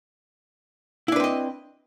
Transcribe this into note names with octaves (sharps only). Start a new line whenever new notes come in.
C4 D4 E4 B4 D#5